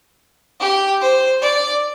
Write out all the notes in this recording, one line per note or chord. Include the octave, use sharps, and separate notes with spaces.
G4
C5
D5